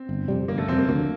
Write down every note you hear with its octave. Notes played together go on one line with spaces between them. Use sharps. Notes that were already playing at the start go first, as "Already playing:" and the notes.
Already playing: C4
G1
F2 C3 G3
G1 A#3
A3
F2 C3 G3 C4
A#3
D2 A#3